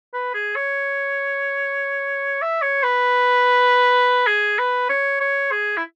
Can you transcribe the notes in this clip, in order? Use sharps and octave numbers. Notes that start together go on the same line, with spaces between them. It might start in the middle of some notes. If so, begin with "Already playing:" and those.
B4
G#4
C#5
E5
C#5
B4
G#4
B4
C#5
C#5
G#4
E4